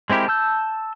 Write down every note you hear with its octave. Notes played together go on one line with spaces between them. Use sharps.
G#3 C4 E4 G4 A#4
A5 E6 G6